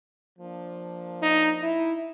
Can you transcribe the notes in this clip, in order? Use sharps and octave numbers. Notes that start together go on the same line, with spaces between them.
F3 A#3 D4
D#4
E4